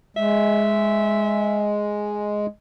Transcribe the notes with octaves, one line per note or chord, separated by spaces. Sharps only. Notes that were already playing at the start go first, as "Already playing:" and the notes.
G#3 E5